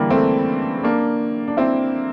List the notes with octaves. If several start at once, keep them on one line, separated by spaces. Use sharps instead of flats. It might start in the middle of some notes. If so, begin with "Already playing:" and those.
Already playing: D3 E3 G3 A#3
A3 C4
A#3 D4
D4
C4 E4